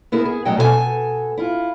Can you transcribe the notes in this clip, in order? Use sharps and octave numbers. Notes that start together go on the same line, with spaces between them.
B3 E4 G#4 A#4
G#4
A2 F#3 C#4 F#4 D#5 G5
B2 A4 A#4 G#5
E4 F4